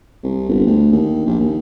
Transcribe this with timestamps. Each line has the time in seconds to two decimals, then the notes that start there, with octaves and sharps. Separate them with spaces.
0.23 C2
0.49 G1
0.67 D2
0.92 D#2
1.26 A#1
1.39 D#2